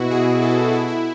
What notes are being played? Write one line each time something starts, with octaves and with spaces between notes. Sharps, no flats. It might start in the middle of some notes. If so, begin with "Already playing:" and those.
Already playing: B2 E4 F#4
G#4
A4
E4
E4